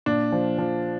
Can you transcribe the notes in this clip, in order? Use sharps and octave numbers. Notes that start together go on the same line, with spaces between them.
A#2 D4
F3
F3